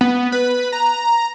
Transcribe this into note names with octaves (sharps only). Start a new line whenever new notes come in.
B3
B4
A#5